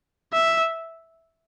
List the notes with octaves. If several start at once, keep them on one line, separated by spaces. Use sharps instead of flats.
E5